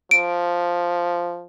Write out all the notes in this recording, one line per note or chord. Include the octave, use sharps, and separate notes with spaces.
F3 D7